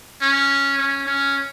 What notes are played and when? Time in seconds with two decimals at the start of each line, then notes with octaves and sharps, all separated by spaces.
0.22 C#4
0.79 C#4
1.06 C#4